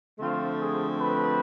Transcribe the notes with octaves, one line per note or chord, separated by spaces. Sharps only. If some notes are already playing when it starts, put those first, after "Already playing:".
D3 F3 A3 C4 F4
G#4
B4